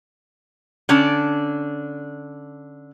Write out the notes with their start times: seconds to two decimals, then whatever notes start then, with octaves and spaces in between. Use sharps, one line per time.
0.89 D3 C#4 D4 A5